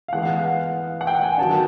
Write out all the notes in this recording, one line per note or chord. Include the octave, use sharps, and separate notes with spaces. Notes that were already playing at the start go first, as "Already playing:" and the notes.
F5
E3 G#3 B3 F#5
F5
F#5
F#5
G5
G#5
D#3 F#3 B3 D4 A5